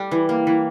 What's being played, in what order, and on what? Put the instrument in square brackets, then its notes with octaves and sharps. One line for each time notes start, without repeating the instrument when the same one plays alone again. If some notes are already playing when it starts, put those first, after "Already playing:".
Already playing: [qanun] G3 A3 G4
E3
A#3
E3